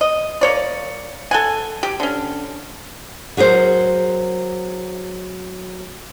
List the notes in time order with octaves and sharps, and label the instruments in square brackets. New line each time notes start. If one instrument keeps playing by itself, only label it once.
[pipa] D#5
A#3 C#5 D5
A4 F#5 G#5
G4
D3 C#4
[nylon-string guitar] F#3 G#4 A#4 C5